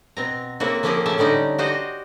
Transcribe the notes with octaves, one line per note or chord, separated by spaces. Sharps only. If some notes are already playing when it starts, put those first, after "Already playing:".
B2 C4 A#5
C#3 A#3 C4 E4 F#4
F3 A#3 C#4 E4 G4 G#4
A2 C#3 C#4 E5 A5
D3 G3 C#4 D#4 G5
F#4 G4 C5 D5 D#5